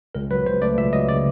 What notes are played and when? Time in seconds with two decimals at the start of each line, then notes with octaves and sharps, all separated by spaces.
0.15 C#2 A#4
0.31 F#3 B4
0.46 C#2 C5
0.62 A3 D5
0.77 C#2 E5
0.93 F#3 D#5
1.08 C#3 D5